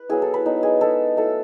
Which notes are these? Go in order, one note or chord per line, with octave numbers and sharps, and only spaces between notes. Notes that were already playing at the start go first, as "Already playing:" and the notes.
Already playing: B4
F#3 B3 E4 G#4
A4
B4
F#3 B3 D#4
G#4
G#3 D#4 A4
F#3 A3 E4 A4